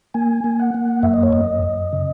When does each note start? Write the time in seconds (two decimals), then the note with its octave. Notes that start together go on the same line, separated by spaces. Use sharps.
0.14 A#3 G#5
0.44 A#3
0.60 F#5
0.74 A#3
1.03 F#2 E5
1.13 D#5
1.23 C#5
1.33 F#2 D#5
1.63 F#2
1.93 C#3